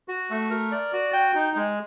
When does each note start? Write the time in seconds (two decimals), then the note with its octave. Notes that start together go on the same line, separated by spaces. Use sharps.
0.08 F#4
0.30 A3
0.50 A#4
0.72 D5
0.93 F#4
1.13 G5
1.35 D#4
1.56 G#3